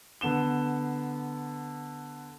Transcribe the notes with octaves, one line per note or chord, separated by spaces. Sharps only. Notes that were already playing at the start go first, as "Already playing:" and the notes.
D3 B3 E7 G7